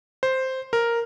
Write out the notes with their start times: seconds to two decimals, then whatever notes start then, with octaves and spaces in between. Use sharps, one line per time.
0.23 C5
0.73 A#4